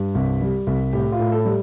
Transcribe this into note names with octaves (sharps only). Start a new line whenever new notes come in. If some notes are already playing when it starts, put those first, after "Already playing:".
Already playing: G2
C2
G3
C2
A2 G4
F4
A2
A4
G3